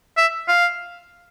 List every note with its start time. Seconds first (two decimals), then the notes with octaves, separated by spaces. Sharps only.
0.17 E5
0.48 F5